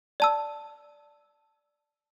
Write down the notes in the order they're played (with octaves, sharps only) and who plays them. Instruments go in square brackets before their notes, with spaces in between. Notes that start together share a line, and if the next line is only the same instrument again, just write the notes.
[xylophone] D5 A5 E6